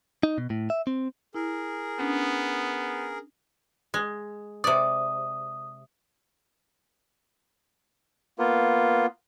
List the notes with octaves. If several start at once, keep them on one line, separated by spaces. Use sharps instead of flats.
D#4
B2
A2
E5
C4
E4 G#4 A#4
B3 C#4 D4
G#3
C3 D5 D#6
A#3 B3 F4